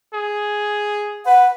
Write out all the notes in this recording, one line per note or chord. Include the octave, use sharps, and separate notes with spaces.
G#4
B4 F#5